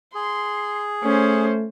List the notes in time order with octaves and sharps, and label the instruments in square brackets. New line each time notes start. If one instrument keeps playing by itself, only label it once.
[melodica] G#4 [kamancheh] C6
[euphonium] A3 [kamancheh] C#4 C5